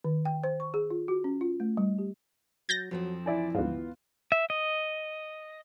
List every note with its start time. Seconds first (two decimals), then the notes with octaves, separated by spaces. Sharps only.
0.04 D#3
0.25 G5
0.44 C5
0.60 C#6
0.74 G#4
0.91 F4
1.08 F#4
1.24 C#4
1.41 F4
1.60 A3
1.77 G3
1.99 G4
2.69 F#3 G6 A6 A#6
2.91 F2 F3 F#3 C4
3.26 E3 E4 D5 G#5
3.55 D2 G#2 B3 F4
4.32 E5
4.50 D#5